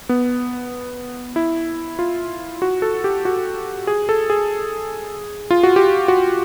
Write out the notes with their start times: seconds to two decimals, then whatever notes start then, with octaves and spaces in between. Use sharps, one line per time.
0.09 B3
1.36 E4
1.99 F4
2.62 F#4
2.82 A4
3.04 G4
3.25 F#4
3.87 G#4
4.09 A4
4.30 G#4
5.51 F4
5.63 F#4
5.76 G4
6.08 F#4